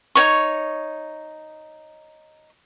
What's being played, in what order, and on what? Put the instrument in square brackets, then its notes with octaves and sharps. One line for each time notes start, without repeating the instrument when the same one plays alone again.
[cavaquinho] D#4 C#5 C#6